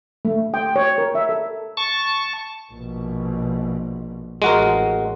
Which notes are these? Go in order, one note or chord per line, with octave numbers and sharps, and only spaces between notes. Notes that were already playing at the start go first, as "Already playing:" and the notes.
A3
G5
C#5
A#4
E5
A4
A5 C#6
A#1 B2
A1 G#3 F#4 A#4